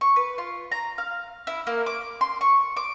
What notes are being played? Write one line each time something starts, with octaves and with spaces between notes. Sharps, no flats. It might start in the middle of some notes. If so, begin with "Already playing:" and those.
C#6
B4
F4
A#5
F5
E4
A#3
D6
C6
C#6
D6